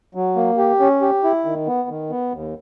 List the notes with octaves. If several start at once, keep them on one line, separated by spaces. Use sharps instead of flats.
F#3
A#3
G4
C#4
G4
E4
D#3
B3
D#3
B3
D#2